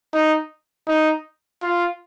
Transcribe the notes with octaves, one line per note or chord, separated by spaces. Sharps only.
D#4
D#4
F4